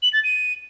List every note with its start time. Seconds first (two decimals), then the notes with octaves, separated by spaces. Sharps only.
0.02 F#7
0.13 A6
0.24 D#7